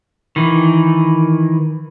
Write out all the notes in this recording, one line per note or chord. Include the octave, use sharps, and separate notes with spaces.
D#3 E3